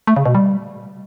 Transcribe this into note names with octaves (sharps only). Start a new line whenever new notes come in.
A3
C#3
B2
G3